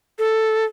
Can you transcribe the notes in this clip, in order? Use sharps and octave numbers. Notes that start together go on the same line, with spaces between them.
A4